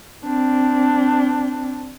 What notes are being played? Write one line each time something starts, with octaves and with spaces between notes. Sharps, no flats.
C4 D4